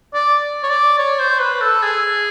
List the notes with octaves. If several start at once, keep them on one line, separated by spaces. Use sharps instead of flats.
D5
C#5
D5
C#5
C5
B4
A4
G#4